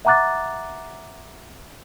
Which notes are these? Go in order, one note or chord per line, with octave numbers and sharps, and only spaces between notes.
E5 F#5 A#5 D6 F#6 A6